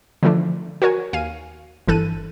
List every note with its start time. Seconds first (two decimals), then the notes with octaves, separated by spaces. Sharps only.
0.23 D3 E3 F3 A3 D4
0.82 F#4 A#4 C#5 G#5
1.13 D#2 F5 G#5 D#7
1.87 G1 E3 A4 F#6 D#7